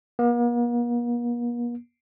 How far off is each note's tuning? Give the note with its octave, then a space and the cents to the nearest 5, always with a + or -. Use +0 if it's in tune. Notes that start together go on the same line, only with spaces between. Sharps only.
A#3 +45